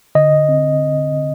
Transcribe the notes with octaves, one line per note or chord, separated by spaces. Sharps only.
D3 D#5
C4